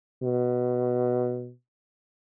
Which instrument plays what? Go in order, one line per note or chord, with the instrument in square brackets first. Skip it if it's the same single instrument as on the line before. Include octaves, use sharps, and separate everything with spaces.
[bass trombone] B2